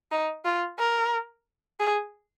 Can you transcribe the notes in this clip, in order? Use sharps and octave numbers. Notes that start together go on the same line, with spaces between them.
D#4
F4
A#4
G#4